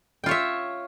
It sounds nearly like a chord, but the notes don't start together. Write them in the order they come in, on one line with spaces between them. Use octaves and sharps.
G5 F4 C#5 E5